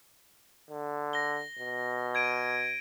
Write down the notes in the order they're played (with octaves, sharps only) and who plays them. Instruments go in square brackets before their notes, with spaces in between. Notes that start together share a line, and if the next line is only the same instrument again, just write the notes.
[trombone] D3
[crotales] A#6 G7
[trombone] B2
[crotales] G#6 D7 D#7